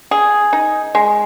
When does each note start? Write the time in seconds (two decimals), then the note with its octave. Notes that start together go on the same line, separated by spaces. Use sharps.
0.11 G#4
0.53 D#4
0.95 G#3